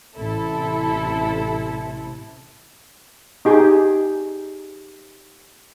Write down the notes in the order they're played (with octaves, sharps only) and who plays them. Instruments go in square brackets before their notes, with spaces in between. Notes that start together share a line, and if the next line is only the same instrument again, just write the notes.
[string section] A1 C3 E4 A4
[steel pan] D#4 G4 G#4 D#6